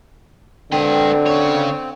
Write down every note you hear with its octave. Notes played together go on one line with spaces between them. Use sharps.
D3 C4 B4 G5
C#3 C#5